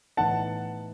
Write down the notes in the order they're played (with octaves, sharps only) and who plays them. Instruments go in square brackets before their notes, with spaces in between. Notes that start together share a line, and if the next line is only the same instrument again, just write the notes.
[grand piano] A2 E3 B3 D#4 F#5 A5